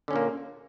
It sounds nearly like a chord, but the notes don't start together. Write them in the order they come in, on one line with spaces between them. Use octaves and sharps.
D3 C#4 A#2 A#3